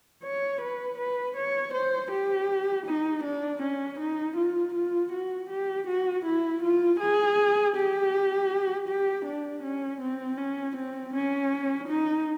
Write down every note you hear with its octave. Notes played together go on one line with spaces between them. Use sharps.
C#5
B4
B4
C#5
C5
G4
D#4
D4
C#4
D#4
F4
F4
F#4
G4
F#4
E4
F4
G#4
G4
G4
D4
C#4
C4
C#4
C4
C#4
D#4